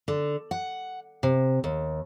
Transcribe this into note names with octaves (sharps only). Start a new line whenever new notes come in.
D3
F#5
C3
D#2